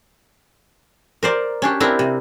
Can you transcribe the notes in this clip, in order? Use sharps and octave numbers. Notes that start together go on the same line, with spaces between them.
A#4 C5 D5
C#4 D4 G4
C4 D4 E4 G4 A#4
C3